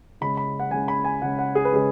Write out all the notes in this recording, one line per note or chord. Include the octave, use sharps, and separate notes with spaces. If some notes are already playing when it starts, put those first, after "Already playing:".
C#3 G#3 C#4 B5
B5
F#5
C#3 G#3 C#4 G#5
B5
G#5
C#3 G#3 C#4 F#5
F#5
G#4
B4
C#3 G#3 C#4 G#4